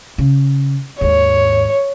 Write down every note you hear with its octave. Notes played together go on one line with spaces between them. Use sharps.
C#3
D#2 G#2 C#5